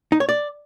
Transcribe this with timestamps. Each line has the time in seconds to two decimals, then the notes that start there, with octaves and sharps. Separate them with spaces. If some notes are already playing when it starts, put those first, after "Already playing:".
0.12 D#4
0.20 C#5
0.29 D5